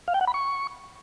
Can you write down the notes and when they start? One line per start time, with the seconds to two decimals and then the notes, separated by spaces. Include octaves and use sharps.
0.08 F5
0.14 G5
0.21 F#5
0.27 B5
0.34 C#6